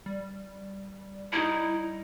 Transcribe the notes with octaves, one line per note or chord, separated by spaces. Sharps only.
G3
D#4 E4 A#5